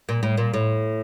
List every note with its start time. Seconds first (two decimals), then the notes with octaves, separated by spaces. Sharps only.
0.09 A#2
0.23 A2
0.37 A#2
0.53 A2